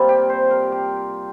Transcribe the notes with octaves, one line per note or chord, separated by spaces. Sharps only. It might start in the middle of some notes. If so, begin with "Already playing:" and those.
Already playing: C3 G3 A#3 F4
G4
C5
A#4
G4